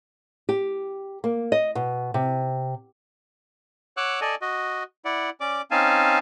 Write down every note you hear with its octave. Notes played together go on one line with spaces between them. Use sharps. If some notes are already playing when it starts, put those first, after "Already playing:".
G4
A#3
D#5
B2
C3
C#5 F#5 D6 E6 F#6
A4 D5 D#5 G#5
F#4 D#5
E4 D5 F#5
C#4 D5 D6
C4 C#4 D#4 F5 G#5 A5